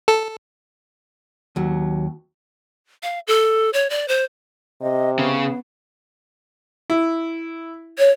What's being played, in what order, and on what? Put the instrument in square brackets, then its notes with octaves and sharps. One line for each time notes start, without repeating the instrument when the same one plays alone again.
[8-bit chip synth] A4
[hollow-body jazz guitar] D#2 F#3
[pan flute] F5
A4
C#5
D5
C5
[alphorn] C3 [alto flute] D#5
[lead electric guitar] C#3 [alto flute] B3
[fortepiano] E4
[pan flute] C#5